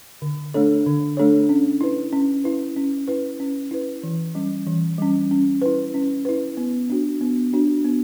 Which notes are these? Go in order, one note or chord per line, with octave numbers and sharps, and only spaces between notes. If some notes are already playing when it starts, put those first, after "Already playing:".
D3
A3 D4 A4 C#5
D3
A3 D4 A4 C#5
C#4
E4 B4
C#4
E4 B4
C#4
E4 B4
C#4
E4 B4
E3
G3 C#4
E3
G3 C#4
C#4
E4 B4
C#4
E4 B4
B3
D4 F#4
B3
D4 F#4
B3